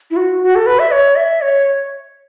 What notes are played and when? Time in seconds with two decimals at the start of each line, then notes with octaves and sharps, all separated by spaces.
0.11 E4
0.16 F#4
0.43 F#4
0.56 A4
0.66 B4
0.79 E5
0.92 C#5
1.16 E5
1.41 C#5